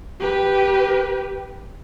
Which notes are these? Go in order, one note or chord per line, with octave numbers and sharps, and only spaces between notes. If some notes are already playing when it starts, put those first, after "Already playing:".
G4 B4